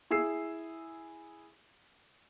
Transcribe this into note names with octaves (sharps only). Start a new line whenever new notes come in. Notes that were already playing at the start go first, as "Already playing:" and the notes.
E4 G#4 E6 C7